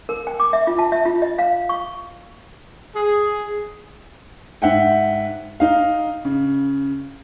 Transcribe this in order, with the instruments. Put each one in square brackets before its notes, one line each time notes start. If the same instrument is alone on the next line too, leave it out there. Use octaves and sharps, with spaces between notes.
[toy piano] A#4
G5
D6
E5
F4
A5
E5
F4
D#5
F5
C#6
[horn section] G#4
[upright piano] G#2 E5 F#5 G5
D#4 F5
C#3